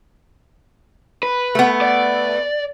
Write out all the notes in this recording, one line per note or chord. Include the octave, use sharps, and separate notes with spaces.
B4
A3 B3
D5